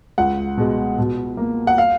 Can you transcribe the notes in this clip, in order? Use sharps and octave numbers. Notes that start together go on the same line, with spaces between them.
C#2 F#5
B2 G#3
B2
A#3
F#5
F5